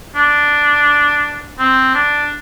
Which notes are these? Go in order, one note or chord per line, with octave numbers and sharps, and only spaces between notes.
D4
C4
D4